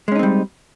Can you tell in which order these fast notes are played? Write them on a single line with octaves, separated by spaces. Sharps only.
G#3 C#4 D#4 C4 G3